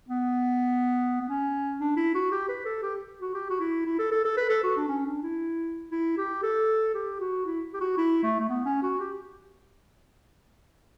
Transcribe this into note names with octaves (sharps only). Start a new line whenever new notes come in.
B3
B3
C#4
D4
E4
F#4
G4
B4
A4
G4
F#4
G4
F#4
E4
E4
A4
A4
A4
B4
A4
F#4
D4
C#4
D4
E4
E4
G4
A4
G4
F#4
E4
G4
F#4
E4
A3
A3
B3
C#4
F#4
G4